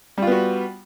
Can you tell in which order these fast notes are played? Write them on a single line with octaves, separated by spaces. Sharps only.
G3 F4 B3 F#4